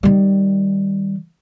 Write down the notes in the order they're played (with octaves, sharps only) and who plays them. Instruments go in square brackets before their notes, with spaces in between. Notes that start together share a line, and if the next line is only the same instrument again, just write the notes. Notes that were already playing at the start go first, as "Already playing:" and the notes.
[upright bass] D#3 G3